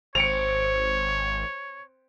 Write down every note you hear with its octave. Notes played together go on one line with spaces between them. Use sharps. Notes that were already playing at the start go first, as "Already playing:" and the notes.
G#1 C4 C#5 C#7 D7 F7